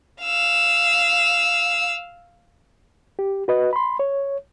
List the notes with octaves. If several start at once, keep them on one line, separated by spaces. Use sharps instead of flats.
F5 E6
G4
F#4 B4 D#5
B5 C6
C#5